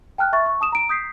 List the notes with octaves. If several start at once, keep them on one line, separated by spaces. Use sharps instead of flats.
G5 A5 F6 F#6
E5 A5 C#6 A6
C#6
A5 D#6 E7
A#5 D7
D#6 G6 B6 C7